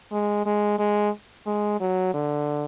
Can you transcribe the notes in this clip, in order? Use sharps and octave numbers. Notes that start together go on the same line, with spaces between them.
G#3
G#3
G#3
G#3
F#3
D3